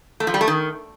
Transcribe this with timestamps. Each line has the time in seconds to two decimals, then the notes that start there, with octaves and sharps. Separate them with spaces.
0.20 A3
0.27 F3
0.34 G3
0.41 A3
0.48 D#3